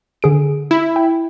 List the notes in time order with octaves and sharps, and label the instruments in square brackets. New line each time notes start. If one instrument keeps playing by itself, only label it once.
[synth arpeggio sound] D3 G#4 D7
[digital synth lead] E4
[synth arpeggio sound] G5